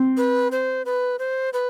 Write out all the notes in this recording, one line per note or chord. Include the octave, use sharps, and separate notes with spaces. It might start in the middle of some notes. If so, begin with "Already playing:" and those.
Already playing: C4
B4
C5
B4
C5
B4